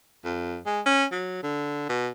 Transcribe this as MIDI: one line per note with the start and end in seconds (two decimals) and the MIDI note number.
0.24 0.59 41
0.66 0.81 56
0.86 1.05 61
1.12 1.38 54
1.43 1.86 50
1.89 2.09 47